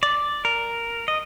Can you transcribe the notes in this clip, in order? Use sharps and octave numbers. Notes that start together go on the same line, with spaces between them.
D5
A#4
D#5